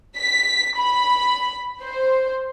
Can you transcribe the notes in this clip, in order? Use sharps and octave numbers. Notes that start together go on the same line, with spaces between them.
B6
B5
C5